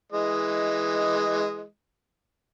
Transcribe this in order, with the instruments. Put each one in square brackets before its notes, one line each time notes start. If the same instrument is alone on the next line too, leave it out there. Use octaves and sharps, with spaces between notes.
[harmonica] E3 G#3 D#5